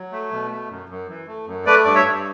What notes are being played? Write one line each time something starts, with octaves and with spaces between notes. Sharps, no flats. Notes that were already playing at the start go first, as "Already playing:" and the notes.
Already playing: F#3
A3
B2
A3
F#2
F#2
E3
A3
F#2
A3 B4 D5
G2 D5
C#5 E5
G2